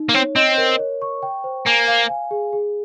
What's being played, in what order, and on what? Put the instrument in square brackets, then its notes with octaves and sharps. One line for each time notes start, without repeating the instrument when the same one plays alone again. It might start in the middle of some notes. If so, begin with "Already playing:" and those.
Already playing: [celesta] D#4
[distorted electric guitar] A#3
[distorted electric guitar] C4 [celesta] C#5
[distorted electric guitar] C4 [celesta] D#5
[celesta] A#4
C#5
C#6
G5
C5
[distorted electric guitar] A#3 [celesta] G#5
[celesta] F5
G#5
G#4
G#4